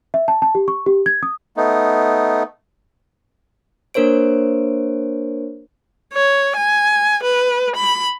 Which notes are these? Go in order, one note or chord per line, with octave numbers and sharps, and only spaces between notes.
E5
A5
A5
G4
C#6
G4
G#6
D#6
A3 B3 D#4
A#3 D4 A#4 C5 C#5 D7
C#5
G#5
B4
B5